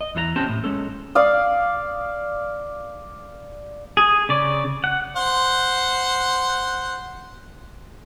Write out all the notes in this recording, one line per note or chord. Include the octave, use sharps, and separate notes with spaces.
D#5
E2 E3 D4 A#5
C4 C#4 G4 G5 A5
A2
G#3 C#4 A4
D5 F5 D#6
G#4
C#3 D5
F#5
C5 F#5